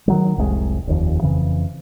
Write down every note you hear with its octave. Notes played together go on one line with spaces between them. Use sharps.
D#3 F#3 G3
F1 C2 G#2 G#3
F1 D#2
F2 C#3 E3